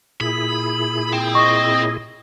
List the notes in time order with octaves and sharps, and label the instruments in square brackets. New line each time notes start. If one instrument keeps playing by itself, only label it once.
[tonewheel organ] A#2 E4 G#4 [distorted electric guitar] B5
[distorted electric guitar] C4
[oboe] D#5 [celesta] C#6